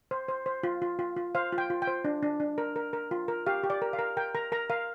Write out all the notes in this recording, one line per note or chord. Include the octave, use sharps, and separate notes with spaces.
C5
C5
C5
F4
F4
F4
F4
C5 F5
F4
G5
F4
G5
C5
D4
D4
D4
A#4
A#4
A#4
F4
A#4
G4 F5
G4
D5
A#4
F5
A#4
A#4 G5
A#4 A#5
A#4 A#5
A#4 F5